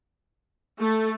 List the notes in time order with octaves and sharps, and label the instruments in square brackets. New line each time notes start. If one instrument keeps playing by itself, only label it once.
[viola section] A3